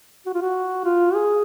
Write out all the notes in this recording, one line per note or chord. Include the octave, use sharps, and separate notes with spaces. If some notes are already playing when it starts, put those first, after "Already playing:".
F#4
F4
F#4
F4
G#4